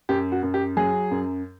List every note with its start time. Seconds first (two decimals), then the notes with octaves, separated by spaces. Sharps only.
0.09 F#2 G4
0.32 F#4
0.43 F#2
0.54 G4
0.77 F#3 G#4
1.11 F#2